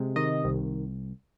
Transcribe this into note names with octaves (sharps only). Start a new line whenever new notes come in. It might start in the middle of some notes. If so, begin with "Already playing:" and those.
Already playing: C3 G#3
D#3 D#5
C2